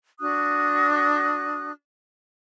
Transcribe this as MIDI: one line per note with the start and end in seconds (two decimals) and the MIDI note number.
0.20 1.70 62
0.20 1.70 66
0.20 1.70 87
0.20 1.70 90